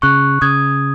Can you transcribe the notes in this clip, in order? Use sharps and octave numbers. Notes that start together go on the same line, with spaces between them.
C#3 C#6 F#6
C#3 D#6 G#6